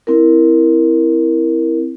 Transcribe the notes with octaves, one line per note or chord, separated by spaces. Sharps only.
C4 E4 A#4